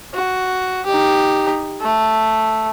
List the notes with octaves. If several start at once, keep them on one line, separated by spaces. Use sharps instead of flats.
F#4
D#4 G4
A3